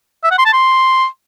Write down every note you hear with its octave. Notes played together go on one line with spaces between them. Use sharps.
E5
F#5
C6
A5
C6